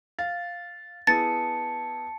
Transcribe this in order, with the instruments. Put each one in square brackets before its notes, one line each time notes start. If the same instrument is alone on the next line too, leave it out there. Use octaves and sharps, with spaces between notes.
[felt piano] F5 [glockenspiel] A6
[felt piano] B3 E4 G#4 [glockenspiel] A5 C#7 [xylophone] A6